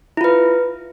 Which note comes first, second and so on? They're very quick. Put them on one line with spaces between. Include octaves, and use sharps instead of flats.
E4 F4 B4